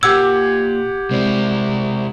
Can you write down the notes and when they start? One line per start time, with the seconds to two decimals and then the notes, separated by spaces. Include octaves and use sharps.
0.03 A#2 G4 F#5 E6 G#6
1.11 C3 G#3 E4 C5 D5